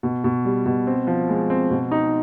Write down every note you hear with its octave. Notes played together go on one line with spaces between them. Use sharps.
B2
B2
G3
B2
C4
F3
G#3
C4
B2
D#4